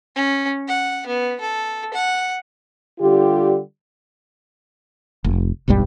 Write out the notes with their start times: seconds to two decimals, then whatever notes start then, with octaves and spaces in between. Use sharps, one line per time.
0.16 C#4
0.68 F#5
1.07 B3
1.41 A4
1.93 F#5
3.00 D3 G3 F4 G4
5.24 F1
5.68 E1 B1 G2 G3